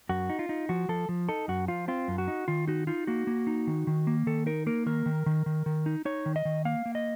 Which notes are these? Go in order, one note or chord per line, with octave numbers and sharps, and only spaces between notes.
F#2 F#4
D#4
F4
D#4
F3 F#4
F3 A4
F3
D#4 A4
F#2 F#4
F3 F4
C4 F4
F#2
F#4
D#4
D#3 F4
D#4 F#4
D#4 F4
A#3 F#4
A#3
D#4
D#3
D#3
A#3
D#3 A4
D#4 A#4
A#3 A#4
D#3 A#4
D#3
D#3
D#3
D#3
D#4
D#4 C#5
D#3
D#5
D#3
A#3 F5
A#3
D#5